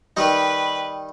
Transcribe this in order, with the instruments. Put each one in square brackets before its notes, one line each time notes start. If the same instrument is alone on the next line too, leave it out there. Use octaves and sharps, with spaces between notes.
[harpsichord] D#3 G3 D#4 [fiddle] B4